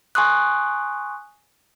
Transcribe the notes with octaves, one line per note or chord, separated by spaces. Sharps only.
G#5 C6 C#6 D#6 F#6